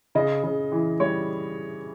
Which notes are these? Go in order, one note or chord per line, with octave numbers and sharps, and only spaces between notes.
C#3 D#5
C#3
E3
G3 C#5